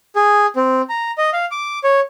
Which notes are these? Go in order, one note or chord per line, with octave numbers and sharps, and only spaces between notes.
G#4
C4
A#5
D#5
F5
D6
C#5